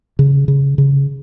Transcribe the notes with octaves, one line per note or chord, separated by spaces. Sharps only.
C#3
C#3
C#3